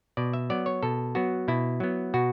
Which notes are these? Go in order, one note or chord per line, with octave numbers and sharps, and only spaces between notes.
B2 D5
E5
F#3 B3 D5
C#5
B2 A4
F#3 B3 F#4
B2 E4
F#3 B3
B2 F#4